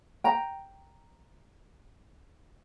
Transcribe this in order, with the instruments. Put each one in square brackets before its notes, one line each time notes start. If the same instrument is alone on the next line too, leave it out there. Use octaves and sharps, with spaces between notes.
[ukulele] G5 A#5